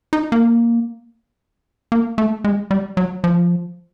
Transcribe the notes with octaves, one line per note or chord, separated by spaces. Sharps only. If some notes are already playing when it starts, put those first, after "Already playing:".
D#4
A#3
A#3
A3
G#3
G3
F#3
F3